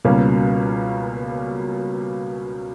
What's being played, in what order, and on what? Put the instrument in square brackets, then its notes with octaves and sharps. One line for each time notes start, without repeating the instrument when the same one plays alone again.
[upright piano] C#2 B2 G3 A#3 C#4